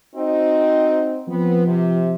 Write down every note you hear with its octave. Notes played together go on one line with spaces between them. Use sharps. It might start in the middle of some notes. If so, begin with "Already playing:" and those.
C4 D#4 F#4
F3 B3 C4
C3 G4